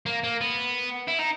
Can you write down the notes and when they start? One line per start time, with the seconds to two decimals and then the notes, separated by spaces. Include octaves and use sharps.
0.06 A#3
0.24 A#3
0.41 B3
1.08 E4
1.19 D#4